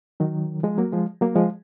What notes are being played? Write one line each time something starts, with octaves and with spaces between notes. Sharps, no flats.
D#3 F#3
F3 G#3
F#3 A#3
F3 G#3
F#3 A#3
F3 G#3